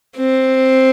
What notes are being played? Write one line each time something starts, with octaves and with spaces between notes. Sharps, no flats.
C4